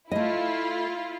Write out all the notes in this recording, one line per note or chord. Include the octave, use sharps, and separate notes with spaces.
A3 E4 F4 D#5